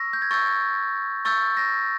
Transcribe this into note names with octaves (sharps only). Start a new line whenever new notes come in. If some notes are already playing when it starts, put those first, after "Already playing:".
Already playing: C#6 E6 A#6
G6
G#6
C#6 E6 G6 A6
C#6 E6 G6 A6
A#6